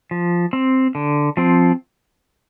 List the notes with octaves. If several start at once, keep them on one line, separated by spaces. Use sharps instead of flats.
F3
C4
D3
F3 C4